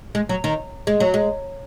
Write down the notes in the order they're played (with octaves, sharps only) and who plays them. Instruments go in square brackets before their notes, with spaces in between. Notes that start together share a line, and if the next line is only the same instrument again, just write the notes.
[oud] G#3
F#3
D#3
G#3
F#3
G#3